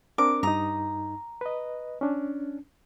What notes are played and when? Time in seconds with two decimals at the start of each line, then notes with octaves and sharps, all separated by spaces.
0.18 C4 D4 A#4 D6
0.43 G2 D#4 A#5 D#6
1.41 B4 D#5
2.01 C#4 D4